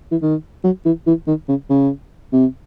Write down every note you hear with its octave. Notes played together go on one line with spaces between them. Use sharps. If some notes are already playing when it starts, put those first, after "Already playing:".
E3
D#3
F#3
E3
E3
D#3
C#3
C#3
C3